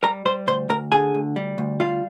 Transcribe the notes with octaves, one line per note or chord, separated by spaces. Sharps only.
G3 A#4 A#5
G3 C5 C6
D2 C5 C6
D2 A#4 A#5
D3 G#4 G#5
D2
G3
D2
G3 F4 F5